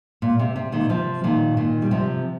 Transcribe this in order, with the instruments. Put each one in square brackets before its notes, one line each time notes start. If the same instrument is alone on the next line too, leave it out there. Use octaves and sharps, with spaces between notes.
[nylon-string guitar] A#2
C3
C3
A#2 D#3
C3 F3
A#2 D#3
A#2 D#3
G3
C3 F3